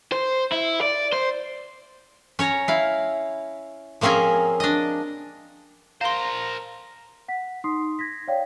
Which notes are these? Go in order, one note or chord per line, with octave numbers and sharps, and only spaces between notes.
C5
E4
D5
C5
C#4 C#5 A#5
E4 F5
F3 A#3 C4 C#4 G#4 A#4
D4 D#5
A#4 C5 F5 A#5 C6
F#5 B6
D#4 C6 D#6 C7
G#6 A#6 B6
C#5 D5 F5 G5